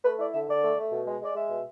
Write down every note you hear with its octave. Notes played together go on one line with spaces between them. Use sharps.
A3 B4
E4 D5
D3 E5
D3 D5
A3
A3
B2
G#3
G#3 D5
G#3 E5
B2